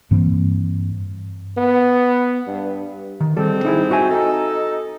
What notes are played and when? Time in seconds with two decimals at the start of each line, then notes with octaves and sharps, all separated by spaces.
0.11 G2 E3 A#3 C4
1.57 B3
2.47 G2
3.20 D#3
3.37 G#2 G3 C4 A4
3.65 D#4 E4 G#4
3.91 F#4 E5 G#5
4.10 D#4 A4